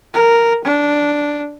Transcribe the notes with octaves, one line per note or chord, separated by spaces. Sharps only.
A#4
D4